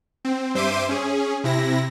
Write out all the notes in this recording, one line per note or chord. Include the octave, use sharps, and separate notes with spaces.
C4
G2 C5 E5 C6 D6 D#7
C#4 G#4
C3 E4 A#6